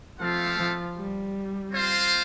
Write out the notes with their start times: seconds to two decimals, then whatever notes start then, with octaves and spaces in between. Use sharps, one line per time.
0.20 F3 A3 C4 A4 F5
0.58 F3
0.97 G3
1.72 C4 F4 C5 F5